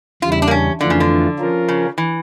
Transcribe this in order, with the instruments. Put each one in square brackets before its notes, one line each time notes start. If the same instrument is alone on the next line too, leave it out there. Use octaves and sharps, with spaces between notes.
[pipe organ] E2 C#3 G3 [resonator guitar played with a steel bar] F4
[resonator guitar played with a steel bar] E4
D4
A#3
C#4
[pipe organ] F2 E3 A3 D4 F4 [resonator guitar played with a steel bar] D3
[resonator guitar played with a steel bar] C#3
D3
[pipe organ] F3 C#4 F4 A#4
[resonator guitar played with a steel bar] C#3
E3